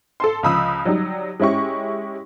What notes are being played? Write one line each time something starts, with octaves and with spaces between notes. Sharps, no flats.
A4 A5 C6
C#2 F3 B5 D#6 E6
F#3 G3 D#4
G#3 C#4 E4 G4 C#6